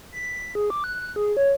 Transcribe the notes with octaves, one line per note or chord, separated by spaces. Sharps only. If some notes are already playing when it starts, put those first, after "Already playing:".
B6
G#4
D6
F#6
G#4
C#5